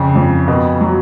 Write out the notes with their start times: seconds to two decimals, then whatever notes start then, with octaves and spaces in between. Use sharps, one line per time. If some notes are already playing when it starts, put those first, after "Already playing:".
Already playing: F2 C#3
0.15 F2
0.48 B2
0.81 F#3